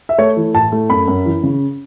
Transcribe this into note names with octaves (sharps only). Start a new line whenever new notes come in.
E5
A3 C#5
E3
A2 A5
A3
F#2 B5
F#2
E3
C#3